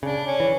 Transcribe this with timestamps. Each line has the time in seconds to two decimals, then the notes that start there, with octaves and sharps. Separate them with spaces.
0.03 C#3 D4
0.27 C#4
0.40 E3